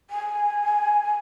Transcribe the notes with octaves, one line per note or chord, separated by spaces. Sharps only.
G#5